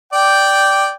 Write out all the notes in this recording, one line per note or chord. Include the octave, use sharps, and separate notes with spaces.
D5 G5